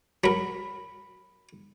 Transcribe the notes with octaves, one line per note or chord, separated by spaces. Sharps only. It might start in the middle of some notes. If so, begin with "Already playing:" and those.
F#3 A#4 B5 B6